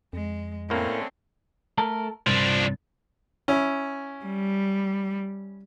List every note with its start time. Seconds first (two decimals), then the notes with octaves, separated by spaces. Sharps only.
0.13 F2 G#3
0.70 A2 D3 A3 A#3 C4 C#4
1.78 A3 A4 A#4
2.27 C2 G2 F3 D4
3.48 C#4 E4
4.25 G3